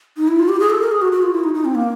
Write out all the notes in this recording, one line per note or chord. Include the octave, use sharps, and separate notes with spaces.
D#4
E4
F4
G4
G#4
A4
A#4
G#4
F#4
F#4
F4
E4
D#4
D#4
C4
A#3